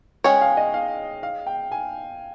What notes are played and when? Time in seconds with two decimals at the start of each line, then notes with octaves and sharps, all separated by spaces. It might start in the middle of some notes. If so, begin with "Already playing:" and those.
0.24 G#3 C#4 G#4 C#5 G5
0.41 F5
0.57 D#5
0.74 F5
1.23 F5
1.47 G5
1.72 G#5